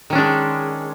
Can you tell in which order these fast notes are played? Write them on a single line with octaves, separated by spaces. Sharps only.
D#3 C#4 D4 G#3